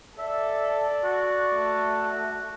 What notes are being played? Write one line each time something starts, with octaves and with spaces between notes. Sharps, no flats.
A4 D5 E5
F#4
A3